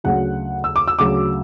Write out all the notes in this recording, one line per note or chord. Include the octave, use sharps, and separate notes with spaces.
D2 C#3 F#3 F#5
E6
D6
E6
D2 C#3 F#3 D6